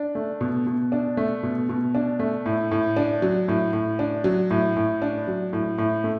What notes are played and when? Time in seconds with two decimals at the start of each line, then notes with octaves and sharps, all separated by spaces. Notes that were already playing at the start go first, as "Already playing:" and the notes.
Already playing: D4
0.15 A3
0.41 B2
0.67 B2
0.92 D4
1.17 A3
1.43 B2
1.69 B2
1.95 D4
2.20 A3
2.46 A2
2.71 A2
2.96 D4
3.22 F#3
3.48 A2
3.73 A2
3.99 D4
4.24 F#3
4.50 A2
4.77 A2
5.02 D4
5.28 F#3
5.53 A2
5.78 A2
6.04 A3